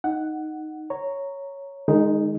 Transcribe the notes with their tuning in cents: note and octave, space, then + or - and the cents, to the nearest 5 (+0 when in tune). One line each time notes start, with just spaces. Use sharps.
D#4 +0 F#5 +5
C#5 +0 A#5 -5
D#3 -40 G#3 +0 D#4 +0